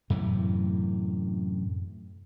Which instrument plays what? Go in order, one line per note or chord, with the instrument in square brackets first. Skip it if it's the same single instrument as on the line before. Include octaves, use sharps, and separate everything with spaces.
[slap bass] F#2 A2 C3 E3